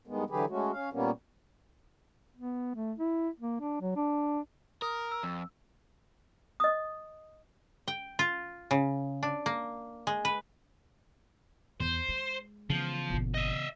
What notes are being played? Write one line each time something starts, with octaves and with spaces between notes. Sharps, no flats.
G2 D#3 G#3 B3
D3 E3 F#3 G4 G#4 B4
G#3 A3 C#4 F#4
C#4 F5
A#2 G3 A#3 B3 C#4
B3
A3
E4
A#3
D4
F#3
D4
A#4 D#6
E6
F2 E6
D#5 D#6
G5
F4
C#3
D4
A#3
G#3
B4
E2 C5
G#3
C#3 E3 F3 B3
G1 A#2
D#5 E5